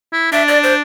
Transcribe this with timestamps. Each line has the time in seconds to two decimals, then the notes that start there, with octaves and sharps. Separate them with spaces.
0.13 E4
0.32 D4 E5
0.48 D5
0.63 C5